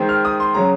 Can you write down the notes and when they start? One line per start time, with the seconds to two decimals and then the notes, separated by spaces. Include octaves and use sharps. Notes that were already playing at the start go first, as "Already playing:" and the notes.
Already playing: D#3 G#3 C4
0.09 F6
0.25 D#6
0.40 C6
0.54 C#3 F#3 C#4 A#5